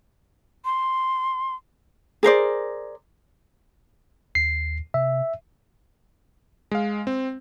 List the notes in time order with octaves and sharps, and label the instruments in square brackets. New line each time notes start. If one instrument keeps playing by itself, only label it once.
[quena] C6
[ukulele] G#4 A#4 C5 D5
[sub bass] D#2 [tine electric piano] C7
[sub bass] C3 [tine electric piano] E5
[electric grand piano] G#3 F5
C4